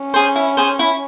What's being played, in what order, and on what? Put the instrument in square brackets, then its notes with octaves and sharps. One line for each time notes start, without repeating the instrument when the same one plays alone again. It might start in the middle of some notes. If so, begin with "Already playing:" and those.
Already playing: [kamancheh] C#4
[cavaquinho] G#4 C5
E4
G#4 C5
E4